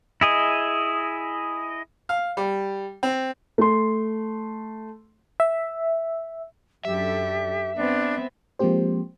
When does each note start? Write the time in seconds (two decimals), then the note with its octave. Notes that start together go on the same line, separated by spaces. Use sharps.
0.21 E4 G#4 D#5
2.09 F5
2.37 G3
3.03 C4
3.58 A3 C6
5.40 E5
6.85 F#2 D4 G4 A4 E5
7.76 B3 C4 D4
8.59 F3 G#3 A#3 C4 G4 C5